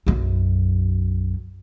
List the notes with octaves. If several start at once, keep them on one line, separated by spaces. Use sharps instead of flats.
B1 F#2